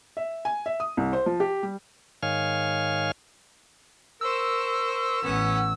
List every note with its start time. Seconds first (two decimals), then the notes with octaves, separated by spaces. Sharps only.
0.17 E5
0.45 G#5
0.66 E5
0.80 D#6
0.97 C2
1.13 C5
1.26 F3
1.40 G4
1.63 G3
2.23 G#2 D#3 C#5 F5 G#5 F6
4.21 A#4 C5 C#6 E6
5.23 A1 B3 C#4 F#5